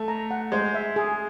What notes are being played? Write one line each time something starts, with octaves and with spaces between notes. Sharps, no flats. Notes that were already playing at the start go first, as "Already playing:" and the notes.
Already playing: A3
A#5
F#5
G#3 C5
E5
G#4